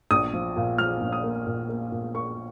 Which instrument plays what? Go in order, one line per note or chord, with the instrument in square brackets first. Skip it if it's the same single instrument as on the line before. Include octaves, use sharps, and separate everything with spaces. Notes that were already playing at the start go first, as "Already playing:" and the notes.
[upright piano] A#1 D#6
F3
A#2
F3 F6
A#1
D#6
A#3
A#2
A#3
A#2
A#3 C#6